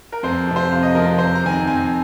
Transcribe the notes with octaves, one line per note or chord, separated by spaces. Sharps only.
A#4
F2 C5
C3 F3
C5
F2 F5
D#5
C3 F3 A#4
A#4
F2 C5
A#5
D#3 C4 G#5
A#5
F2 G#5